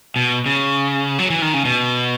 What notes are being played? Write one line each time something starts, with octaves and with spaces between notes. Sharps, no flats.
B2
C#3
F#3
E3
D#3
C#3
B2